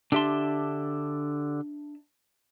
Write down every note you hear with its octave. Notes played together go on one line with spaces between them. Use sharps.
D3 D4 G4 E5 A5 C6